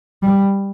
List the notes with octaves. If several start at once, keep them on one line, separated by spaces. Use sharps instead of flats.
G3